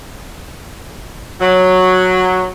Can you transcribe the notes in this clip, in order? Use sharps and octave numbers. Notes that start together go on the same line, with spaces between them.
F#3